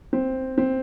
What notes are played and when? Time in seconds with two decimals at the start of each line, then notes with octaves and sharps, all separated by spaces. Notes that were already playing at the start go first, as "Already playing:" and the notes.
0.13 C4
0.58 C4